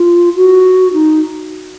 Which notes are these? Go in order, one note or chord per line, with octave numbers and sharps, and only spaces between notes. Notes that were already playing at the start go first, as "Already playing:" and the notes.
Already playing: F4
F#4
D#4